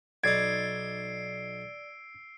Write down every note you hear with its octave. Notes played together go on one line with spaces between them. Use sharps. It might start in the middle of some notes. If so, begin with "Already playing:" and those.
B1 D#4 D5 E6 G#6 A6 C7 D7